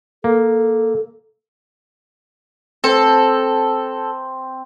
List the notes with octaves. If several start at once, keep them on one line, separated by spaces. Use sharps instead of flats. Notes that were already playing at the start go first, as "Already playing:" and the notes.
A#3 A4
C4 A4